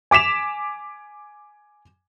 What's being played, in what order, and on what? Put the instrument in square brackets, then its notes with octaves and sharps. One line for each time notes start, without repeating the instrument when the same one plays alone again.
[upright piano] G#5 D6 B6 E7 F7